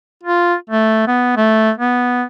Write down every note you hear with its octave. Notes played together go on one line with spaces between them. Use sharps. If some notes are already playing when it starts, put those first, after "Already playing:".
F4
A3
B3
A3
B3